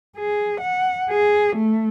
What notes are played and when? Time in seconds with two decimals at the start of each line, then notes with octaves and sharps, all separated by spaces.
0.18 G#4
0.61 F#5
1.10 G#4
1.56 A3